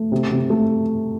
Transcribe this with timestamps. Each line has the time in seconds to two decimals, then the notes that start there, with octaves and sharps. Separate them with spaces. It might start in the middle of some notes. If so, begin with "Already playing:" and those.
Already playing: A3
0.12 C3
0.31 C3
0.50 A3